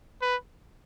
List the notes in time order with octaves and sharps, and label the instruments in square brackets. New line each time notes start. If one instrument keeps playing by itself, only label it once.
[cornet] B4